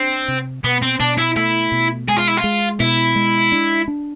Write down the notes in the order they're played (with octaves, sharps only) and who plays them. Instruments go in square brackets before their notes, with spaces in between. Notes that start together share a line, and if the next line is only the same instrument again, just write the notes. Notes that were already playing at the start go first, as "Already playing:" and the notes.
Already playing: [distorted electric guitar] C4 [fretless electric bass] D4
[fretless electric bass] C3
[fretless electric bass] B2 [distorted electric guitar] B3
[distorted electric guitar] C4
[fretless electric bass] B2 [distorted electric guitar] D4
[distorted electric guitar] E4
[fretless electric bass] A3 [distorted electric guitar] E4
[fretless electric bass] B2
[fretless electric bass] G#3 [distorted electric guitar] G#4
[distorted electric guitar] F4
E4
F4
[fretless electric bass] G#3
[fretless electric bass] B2 [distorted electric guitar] E4
[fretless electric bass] G#3
D4
D4